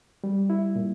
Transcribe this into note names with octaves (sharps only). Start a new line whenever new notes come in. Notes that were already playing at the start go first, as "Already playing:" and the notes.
G3
E4
A#2